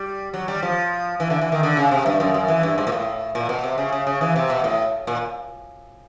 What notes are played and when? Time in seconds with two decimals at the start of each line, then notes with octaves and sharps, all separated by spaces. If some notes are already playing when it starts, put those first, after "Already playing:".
Already playing: G3
0.34 F#3
0.48 G3
0.62 F3
1.20 E3
1.30 D3
1.41 E3
1.52 D#3
1.63 D3
1.77 C#3
1.91 C3
2.06 G2
2.20 F#2
2.34 F#2
2.48 E3
2.63 G2
2.78 G#2
2.87 A#2
2.92 A2
3.35 A#2
3.49 B2
3.63 C3
3.78 C#3
3.92 C#3
4.07 C#3
4.21 E3
4.36 C3
4.50 B2
4.64 A2
5.07 A#2